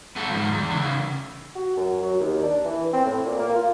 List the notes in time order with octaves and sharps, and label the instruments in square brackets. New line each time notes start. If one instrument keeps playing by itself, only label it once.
[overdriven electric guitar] B3 A4
G#2 F3
E2
C#3 E3
[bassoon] F#4
F#2
F#3
D#2
D4
E3
C4
A2
A#2
A#3
F4